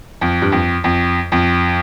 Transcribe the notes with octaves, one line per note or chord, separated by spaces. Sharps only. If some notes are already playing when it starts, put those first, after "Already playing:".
F2
G2
F2
F2
F2